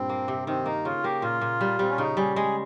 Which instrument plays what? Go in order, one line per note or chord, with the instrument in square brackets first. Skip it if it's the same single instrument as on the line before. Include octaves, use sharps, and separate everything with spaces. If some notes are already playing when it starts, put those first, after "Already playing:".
Already playing: [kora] G2 A#2 [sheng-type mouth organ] C4
[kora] A#3
C3
[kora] D#3 [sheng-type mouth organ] C4
[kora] A#3 [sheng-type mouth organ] D#4
[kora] C#3 [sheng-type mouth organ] F4
[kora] A#3 [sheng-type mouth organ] G4
[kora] A#2 [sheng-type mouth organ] F4
[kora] A#2
G3
[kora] G3 [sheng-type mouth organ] C4
[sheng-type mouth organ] C#4
[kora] C#3 [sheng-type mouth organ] D#4
[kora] G3 [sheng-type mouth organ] G#4
[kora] G#3 [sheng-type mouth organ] G#4